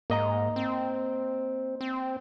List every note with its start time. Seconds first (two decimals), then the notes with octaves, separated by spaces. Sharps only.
0.10 G#2 A#3 D#5 A#5
0.56 C4
1.81 C4